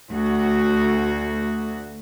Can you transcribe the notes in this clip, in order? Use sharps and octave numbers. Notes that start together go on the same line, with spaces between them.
D2 F#4